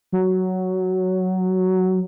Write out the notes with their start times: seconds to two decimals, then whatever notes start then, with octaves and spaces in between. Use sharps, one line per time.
0.12 F#3